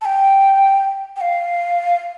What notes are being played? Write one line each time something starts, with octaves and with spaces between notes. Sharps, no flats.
A5
G5
G5
F5